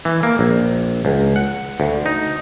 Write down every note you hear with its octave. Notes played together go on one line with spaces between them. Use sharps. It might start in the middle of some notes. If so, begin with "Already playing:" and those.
E3
A#3
A#1
C#2
F#5
D2
D#4